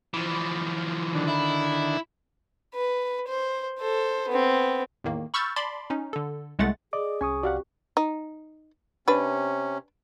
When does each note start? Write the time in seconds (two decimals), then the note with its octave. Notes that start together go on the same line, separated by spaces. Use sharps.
0.14 E3 F3
1.15 D3 D#3 D4
1.28 E4
2.75 B4
3.28 C5
3.79 A4 C5
4.28 B3 C4
5.04 E2 A2 D#3 A#3
5.34 B5 C#6 E6 F6 G6 A6
5.56 D5 A5 B5 C6 D6
5.90 C#4 D#4
6.13 D3 A4
6.59 C2 G#3 A3 F#5 A6
6.93 G#4 D5 D#5 D6
7.21 C2 C#4 G#5 C#6 D#6
7.43 F#4 G4 D5 F5 F#5
7.97 D#4
9.08 C3 C#4 D4 B4